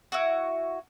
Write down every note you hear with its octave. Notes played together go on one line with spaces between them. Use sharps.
E4 F#4